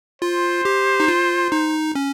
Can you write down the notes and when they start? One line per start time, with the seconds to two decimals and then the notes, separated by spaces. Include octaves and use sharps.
0.22 F4 C5
0.65 G4
1.00 D#4
1.08 F4
1.52 D#4
1.95 C#4